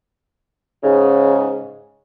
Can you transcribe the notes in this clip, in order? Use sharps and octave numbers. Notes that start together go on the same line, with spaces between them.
G#2 C#3